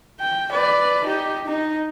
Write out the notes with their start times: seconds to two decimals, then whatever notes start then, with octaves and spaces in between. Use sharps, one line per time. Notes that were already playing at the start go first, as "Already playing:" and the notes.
0.20 G5
0.52 B4 D5
1.04 D#4 G4
1.46 D#4